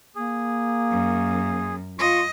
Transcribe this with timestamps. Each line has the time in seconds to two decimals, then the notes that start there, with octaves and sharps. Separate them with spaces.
0.16 A#3 G#4
0.90 F#2
1.99 F4 D#5 C6 C#6